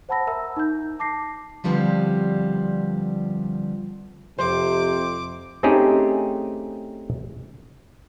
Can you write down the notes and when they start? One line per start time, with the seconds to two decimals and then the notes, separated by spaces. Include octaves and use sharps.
0.09 C5 F#5 A5 B5 E6 A#6
0.27 A#4 E5 A#5 E6
0.57 D#4 G6
0.99 A5 D6 A#6 C7
1.64 D3 F3 G3 B3 C4
4.39 F2 C3 C5 D6
5.63 A3 C4 C#4 D#4 G4 G#4